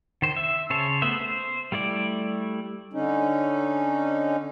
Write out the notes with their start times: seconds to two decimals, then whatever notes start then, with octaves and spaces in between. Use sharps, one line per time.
0.22 D#3 C5
0.36 E5
0.70 C#3 C5 C#5 A5
1.02 A3 B3 C5 E5
1.20 C5
1.72 G3 A3 E4 D5
2.93 D3 C#4 D#4